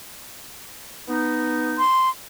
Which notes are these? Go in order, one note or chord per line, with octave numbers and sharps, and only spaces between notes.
B3 D#4
C6